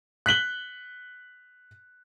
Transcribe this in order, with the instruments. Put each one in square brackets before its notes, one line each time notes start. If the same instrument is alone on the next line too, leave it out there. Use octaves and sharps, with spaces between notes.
[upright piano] F#6 B6 F#7 G7